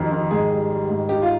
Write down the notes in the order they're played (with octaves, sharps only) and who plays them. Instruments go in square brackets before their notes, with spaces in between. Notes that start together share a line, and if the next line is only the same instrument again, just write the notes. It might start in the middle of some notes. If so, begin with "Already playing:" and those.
Already playing: [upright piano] F2 D#3 G3
D#3
[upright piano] G#2 [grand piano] G#4
[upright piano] G3
G3
G#2
[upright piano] D#4 [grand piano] G4
[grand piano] F4